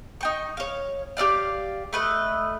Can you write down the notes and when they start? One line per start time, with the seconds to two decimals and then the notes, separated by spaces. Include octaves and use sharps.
0.21 D#4 G5 C#6
0.57 C#5 F5
1.17 G4 A#4 D5 F5
1.93 A3 B4 D#5